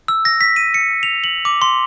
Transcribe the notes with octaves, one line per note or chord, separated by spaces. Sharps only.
E6
A#6
B6
D#7
C#7
F7
F#7
D6
C6